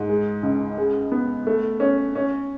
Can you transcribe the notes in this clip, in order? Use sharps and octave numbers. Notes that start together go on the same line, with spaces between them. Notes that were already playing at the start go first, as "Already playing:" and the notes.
Already playing: G#2
G#3
C#2
G#3
B3
A3
C#4
C#4